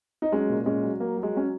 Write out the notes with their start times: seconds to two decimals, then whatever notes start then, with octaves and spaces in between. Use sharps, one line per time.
0.22 D#4
0.32 F#3 G#3 C#4
0.49 A#2
0.66 A#2 G#3 C#4
0.83 F#3
1.00 F#3 A#3
1.17 F#3
1.23 G#3
1.34 F#3 C#4